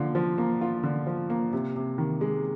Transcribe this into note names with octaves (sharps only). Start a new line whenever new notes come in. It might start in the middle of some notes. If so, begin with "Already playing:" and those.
Already playing: D3 F3 A#3 F4
F3
A#3
F4
D3
F3
A#3
C3
C3
D#3
G#3